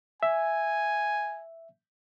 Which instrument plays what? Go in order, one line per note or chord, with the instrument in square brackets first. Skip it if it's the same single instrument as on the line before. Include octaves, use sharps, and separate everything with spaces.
[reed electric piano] E5 [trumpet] G#5